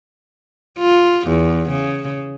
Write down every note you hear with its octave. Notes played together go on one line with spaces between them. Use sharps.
F4
E2
C#3